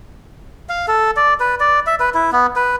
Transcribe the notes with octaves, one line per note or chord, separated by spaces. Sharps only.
F5
A4
D5
B4
D5
E5
B4
E4
B3
B4